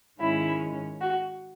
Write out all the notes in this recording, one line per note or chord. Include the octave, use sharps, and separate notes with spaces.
G#2 D#3 G#3 C#4 E4
F#4